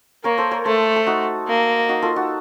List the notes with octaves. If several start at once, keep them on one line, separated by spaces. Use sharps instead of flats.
A#3 A#4 C#5
A4 C5
A#4 C#5
A3 A4 C5
A4
D#4 F#4
A#3
D#4 F#4
F4 A4
D#4 F#4